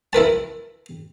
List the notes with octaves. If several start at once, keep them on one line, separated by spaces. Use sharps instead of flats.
E4 A#4 B4 A5